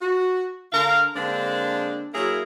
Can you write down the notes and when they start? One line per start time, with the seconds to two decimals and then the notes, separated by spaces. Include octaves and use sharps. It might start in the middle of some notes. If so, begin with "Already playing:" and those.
0.02 F#4
0.72 D3 A#4 F5
1.16 D3 G#3 A#3 C4 D4
2.14 F#3 A#3 E4 G#4 A#4 E5